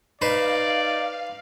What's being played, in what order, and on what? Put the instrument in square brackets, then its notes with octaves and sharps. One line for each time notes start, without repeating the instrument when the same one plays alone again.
[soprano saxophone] D#4 [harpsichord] B4 C5 [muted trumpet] D5 [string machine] F5